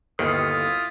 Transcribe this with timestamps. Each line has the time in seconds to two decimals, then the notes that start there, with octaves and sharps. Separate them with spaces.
0.19 G1 D#2 D#3 E4 F4 D#6